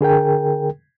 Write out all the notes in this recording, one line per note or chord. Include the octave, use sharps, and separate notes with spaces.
D3 G#4 A#4 G5